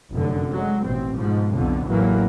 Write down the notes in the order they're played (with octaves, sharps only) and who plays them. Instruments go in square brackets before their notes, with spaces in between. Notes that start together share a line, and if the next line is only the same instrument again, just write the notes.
[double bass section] F1 F#2 D3
F#3 G#3
A1 B2 C4
G#2 B2 F3
B1 F2 B2 D3
A1 E2 E3 F#3 A#3